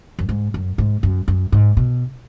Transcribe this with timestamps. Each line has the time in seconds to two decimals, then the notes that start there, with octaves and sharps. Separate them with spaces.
0.19 F#2
0.29 G#2
0.54 F#2
0.78 G#2
1.03 F#2
1.28 F#2
1.52 G#2
1.77 B2